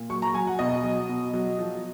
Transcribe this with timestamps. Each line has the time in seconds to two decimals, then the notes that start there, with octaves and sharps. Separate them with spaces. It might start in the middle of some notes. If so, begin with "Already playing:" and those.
Already playing: A#2
0.10 F#3 C#6
0.22 A#5
0.34 F#3 G#5
0.47 F#5
0.59 B2 D#5
0.84 F#3
1.09 B2
1.33 F#3
1.59 F3